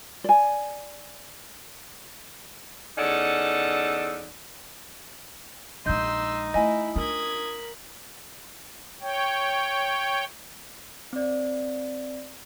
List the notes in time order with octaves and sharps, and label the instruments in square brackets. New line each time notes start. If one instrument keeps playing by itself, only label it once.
[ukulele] D5 G#5
[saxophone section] E2 C#4 D#4 A4 D5 F#5
[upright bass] A#1 G#3 [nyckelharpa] D#4 [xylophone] D#5 G6 [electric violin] C6 E6
[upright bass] A3 [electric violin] E4 [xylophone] D#5 G#5
[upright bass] D4 F4 [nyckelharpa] A#4 B5 [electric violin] D#6 G#6
[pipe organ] C#5 G5
[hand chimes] C4 D5